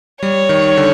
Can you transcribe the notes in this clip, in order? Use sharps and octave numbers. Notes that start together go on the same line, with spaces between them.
G3 C#5
D#3
D3